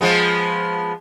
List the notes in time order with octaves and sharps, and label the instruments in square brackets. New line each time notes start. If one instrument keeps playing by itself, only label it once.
[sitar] F3 G#3 B3